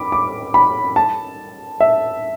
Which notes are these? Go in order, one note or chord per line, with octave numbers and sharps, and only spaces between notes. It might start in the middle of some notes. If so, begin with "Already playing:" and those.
Already playing: B5 D6
D6
B5
A5
E5